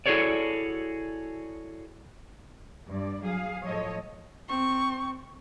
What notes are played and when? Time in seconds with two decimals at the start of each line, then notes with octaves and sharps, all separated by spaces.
0.06 E4 F#4 G#4 A4 C#5 D5
2.88 G2 D5
3.24 F#3 G#4 F5
3.63 A2 F3 A4 C#5 D#5
4.49 C4 C#6